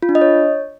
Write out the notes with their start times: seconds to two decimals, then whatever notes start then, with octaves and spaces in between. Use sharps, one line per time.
0.02 F4
0.09 D4
0.15 D#5
0.21 C#5